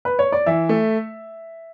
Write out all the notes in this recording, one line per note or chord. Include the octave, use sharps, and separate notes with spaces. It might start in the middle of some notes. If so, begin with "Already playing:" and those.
B4
C#5
D5
E3 E5
A3